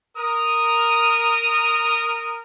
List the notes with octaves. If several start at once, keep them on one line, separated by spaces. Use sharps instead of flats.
A#4 D#6